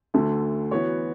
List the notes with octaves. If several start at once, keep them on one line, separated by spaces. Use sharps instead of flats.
D2 D3 A3
E3 B3 F#4 C#5